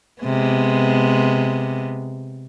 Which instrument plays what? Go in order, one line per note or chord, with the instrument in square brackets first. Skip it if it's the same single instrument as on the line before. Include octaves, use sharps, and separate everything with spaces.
[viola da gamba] C3 G#3 B3